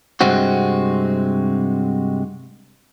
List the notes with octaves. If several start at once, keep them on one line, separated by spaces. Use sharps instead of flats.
G2 C3 G#3 C4 F#4